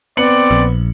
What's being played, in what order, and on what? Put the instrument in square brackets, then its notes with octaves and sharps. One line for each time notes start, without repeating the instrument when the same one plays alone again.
[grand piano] B3 C#7 F#7 [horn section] C4 D5
[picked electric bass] A#1